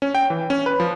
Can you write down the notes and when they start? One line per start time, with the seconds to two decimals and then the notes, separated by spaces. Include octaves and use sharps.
0.02 C#4
0.15 G5
0.30 E3
0.50 C#4
0.66 B4
0.80 F3